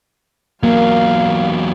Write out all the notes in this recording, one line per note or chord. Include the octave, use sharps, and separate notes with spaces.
E2 F#3 A#3 F5